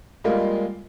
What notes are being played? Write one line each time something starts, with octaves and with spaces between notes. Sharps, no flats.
G3 G#3 A#3 F4